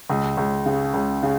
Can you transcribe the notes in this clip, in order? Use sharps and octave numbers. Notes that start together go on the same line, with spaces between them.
C#2
C#2
C#3
C#2
C#3